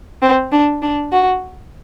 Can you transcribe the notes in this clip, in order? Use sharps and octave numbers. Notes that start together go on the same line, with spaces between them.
C4
D4
D4
F#4